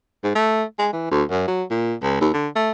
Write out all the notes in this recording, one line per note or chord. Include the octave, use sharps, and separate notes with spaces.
G#2
A3
G#3
E3
D2
F#2
F#3
A#2
C#2
D#2
D3
A3